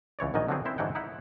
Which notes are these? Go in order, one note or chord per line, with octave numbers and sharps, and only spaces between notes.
C#2 E3 C#5 D5
A#1 G#2 D#3 F#3 D#5 G#5
D3 F3 F#3 B3 C4 G#4
C4 E4 C5
G#2 D3 E3 F#3 F#5 G5
D#4 E4 F#5